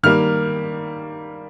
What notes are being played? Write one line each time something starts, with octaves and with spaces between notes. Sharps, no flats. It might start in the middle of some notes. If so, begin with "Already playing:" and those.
D#3 G3 A#3 F6